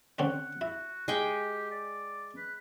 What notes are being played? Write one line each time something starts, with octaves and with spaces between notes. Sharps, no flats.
D3 C4 C#4 F#5
E4 F#4
G#3 G4 G5
D5
B4